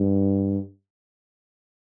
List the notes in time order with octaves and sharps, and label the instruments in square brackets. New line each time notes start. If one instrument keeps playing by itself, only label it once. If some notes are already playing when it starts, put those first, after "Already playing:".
Already playing: [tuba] G2